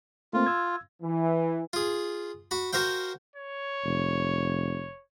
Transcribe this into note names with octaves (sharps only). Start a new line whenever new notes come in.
A3 A#3 C4 F4
E6 G#6
E3
F4 G#4
F#4 B5
F#4 A#4 C5 F5 G5
C#5
F1